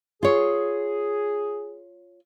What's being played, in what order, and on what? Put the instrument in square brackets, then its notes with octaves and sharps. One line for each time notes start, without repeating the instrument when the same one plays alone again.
[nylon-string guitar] F4 C#5 [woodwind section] G#4